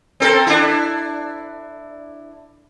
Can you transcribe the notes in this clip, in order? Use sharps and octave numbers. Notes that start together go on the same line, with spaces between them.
C4 A4 A#4
D4 E4